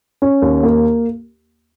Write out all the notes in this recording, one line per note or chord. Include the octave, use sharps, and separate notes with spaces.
C#4
D#2
A#3